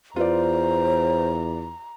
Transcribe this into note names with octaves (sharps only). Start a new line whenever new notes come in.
E2 F4 B4 C5 D5 A#5